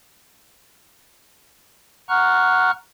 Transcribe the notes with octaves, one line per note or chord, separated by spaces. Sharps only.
F#5 A#5 C#6 F6 F#6